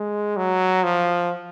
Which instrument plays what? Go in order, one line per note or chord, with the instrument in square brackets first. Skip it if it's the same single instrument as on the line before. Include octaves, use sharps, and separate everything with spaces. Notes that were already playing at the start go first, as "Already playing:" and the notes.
Already playing: [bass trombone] G#3
F#3
F3